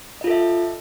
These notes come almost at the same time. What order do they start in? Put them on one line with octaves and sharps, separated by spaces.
D#5 F4 A4 E5